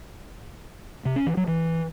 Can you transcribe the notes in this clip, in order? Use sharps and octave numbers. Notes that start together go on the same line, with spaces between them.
C3
C#4
E3
F#3
E3